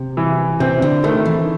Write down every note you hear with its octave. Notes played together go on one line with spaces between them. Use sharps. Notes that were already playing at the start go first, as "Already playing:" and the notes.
Already playing: C3
E3
C3 C4
D3
D#3 A3
E3